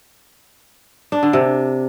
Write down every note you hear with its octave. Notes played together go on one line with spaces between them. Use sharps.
D4
D3
C3